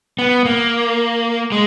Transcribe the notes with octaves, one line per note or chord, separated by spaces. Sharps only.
B3
A#3
G#3